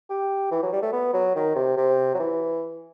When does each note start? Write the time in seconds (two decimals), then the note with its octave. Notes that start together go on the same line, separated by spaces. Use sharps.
0.10 G4
0.51 E3
0.63 F#3
0.72 G3
0.82 A3
0.93 B3
1.14 F#3
1.36 D#3
1.56 C3
1.77 C3
2.14 F#3
2.19 E3